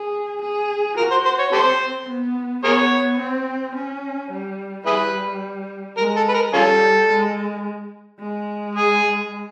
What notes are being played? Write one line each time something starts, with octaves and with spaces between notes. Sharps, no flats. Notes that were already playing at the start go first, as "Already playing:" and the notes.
Already playing: G#4
G#4
F#4 A#4
C5
C5
C#5
C4 G4 A4 C5
B3
B3 G#4 A#4 C#5
C4
C#4
G3
G3 E4 G#4 B4
G#3 A#4
A4
B4
A#4
G3 C#4 F4 A4
G#3
G#3
G#4